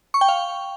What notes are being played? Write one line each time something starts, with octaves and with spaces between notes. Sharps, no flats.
C#6
G5
F5